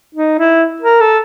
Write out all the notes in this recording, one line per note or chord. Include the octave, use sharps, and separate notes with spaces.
D#4
E4
A#4
A4